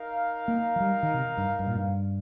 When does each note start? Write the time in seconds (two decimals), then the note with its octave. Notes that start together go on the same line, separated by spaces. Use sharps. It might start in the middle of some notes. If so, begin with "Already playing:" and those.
Already playing: D#4 A#4 F5
0.48 A#3
0.76 F3
0.80 G3
1.03 D#3
1.14 C3
1.37 G2
1.59 G2
1.67 A#2
1.75 G2